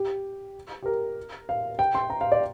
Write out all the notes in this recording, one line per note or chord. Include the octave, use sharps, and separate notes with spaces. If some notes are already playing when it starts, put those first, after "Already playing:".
Already playing: G4
G4
A#4
F5
G5
C6
A#5
F5
D5